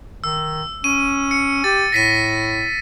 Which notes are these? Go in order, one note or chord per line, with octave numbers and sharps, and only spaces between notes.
D#3 E6
C#4 D#7
C#7
G4 A6
A2 A#6 B6 D#7